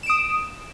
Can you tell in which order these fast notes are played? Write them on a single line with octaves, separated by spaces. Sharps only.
E7 D7 D#6